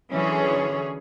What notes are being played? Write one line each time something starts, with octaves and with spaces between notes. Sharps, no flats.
D3 E3 F#3 C#4 G#4 C#5